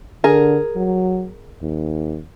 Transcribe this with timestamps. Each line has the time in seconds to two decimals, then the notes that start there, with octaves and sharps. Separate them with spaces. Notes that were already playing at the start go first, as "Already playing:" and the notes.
0.24 D3 G#4 A#4
0.76 F#3
1.62 D#2